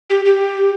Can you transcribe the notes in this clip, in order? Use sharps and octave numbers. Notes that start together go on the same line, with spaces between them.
G4
G4